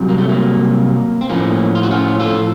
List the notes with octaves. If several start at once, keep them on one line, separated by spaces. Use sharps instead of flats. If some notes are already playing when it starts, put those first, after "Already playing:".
Already playing: C2 C3 F#3
A#3
A3
A#3
C4
A2 F3 A#3 C#4
F4
F#4
C#4 F4
F4 A4